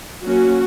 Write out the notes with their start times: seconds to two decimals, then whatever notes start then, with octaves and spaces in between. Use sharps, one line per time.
0.24 F#3 A#3 C#4 F#4